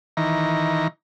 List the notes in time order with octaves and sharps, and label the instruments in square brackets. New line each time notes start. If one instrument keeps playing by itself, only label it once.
[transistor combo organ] D#3 E3 A#5